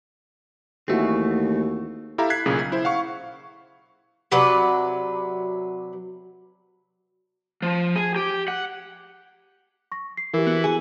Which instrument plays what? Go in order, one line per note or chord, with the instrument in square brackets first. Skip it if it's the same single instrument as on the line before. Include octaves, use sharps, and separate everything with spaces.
[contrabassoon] D#2 [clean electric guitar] E3 A3 C4 [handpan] E4 F#4 G#4
[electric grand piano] E4 G4 A4 E5 F5 A#5
F#6 G#6 B6 C7
B1 A#2 C#3 G#4
G#6
E4 C5
F5 F#5 C#6
[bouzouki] C3 F#3 B4 D5
[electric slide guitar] F3
G#4
G4
F#5
[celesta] C#6 A#6
C7
[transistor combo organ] E3 [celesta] G4 A#4
[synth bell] B3 F#4
[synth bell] G#4 [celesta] G#5